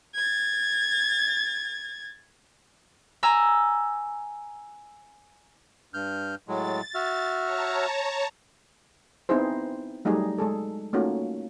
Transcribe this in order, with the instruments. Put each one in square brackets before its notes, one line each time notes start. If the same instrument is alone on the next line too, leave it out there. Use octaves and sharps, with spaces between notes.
[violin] G#6 A6
[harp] G#5 A#5 E6
[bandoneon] G2 F6 G6
[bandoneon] A2 F#3 G#3 [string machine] A6
[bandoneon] F#4 E5 F6
[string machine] C#5 A5 A#5
[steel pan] B3 C4 D#4 E4 G#4 C5
F#3 G3 A3 D#4 G#4
G#3 G#4 A4
A3 A#3 C#4 D#4 F4 F#4